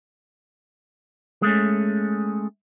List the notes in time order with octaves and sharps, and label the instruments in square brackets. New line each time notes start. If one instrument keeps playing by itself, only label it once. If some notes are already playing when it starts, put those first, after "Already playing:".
[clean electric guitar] G#3 A3 C#4